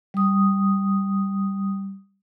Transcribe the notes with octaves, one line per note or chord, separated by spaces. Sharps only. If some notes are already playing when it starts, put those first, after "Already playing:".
G3 D#6